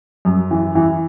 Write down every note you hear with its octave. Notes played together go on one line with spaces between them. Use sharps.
F#2
E3
E3